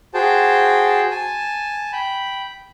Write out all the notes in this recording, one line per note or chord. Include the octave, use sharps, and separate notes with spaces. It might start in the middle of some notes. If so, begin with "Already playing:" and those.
F#4 G#4 C5 G5 A5
G#5 A5
G5 B5